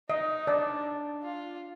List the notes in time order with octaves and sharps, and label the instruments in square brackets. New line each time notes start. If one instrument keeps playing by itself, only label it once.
[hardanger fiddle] D#4 [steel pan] D#5
[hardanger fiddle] D4 [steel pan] D5
[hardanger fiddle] F4